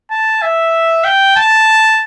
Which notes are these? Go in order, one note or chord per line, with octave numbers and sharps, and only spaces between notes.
A5
E5
G5
A5